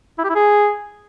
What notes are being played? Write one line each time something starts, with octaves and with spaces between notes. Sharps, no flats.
E4
G4
E4
G#4